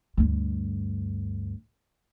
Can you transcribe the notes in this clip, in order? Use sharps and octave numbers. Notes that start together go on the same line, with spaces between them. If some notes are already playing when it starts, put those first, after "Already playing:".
D2 G2